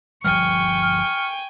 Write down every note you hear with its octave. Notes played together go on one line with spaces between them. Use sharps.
G1 F3 G3 G5 G#5 C#6 F6
F6